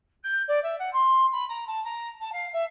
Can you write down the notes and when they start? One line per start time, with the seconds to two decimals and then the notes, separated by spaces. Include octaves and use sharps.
0.23 G6
0.48 D5
0.63 E5
0.78 F#5
0.93 C6
1.32 B5
1.49 A#5
1.67 A5
1.84 A#5
2.20 A5
2.32 F5
2.53 E5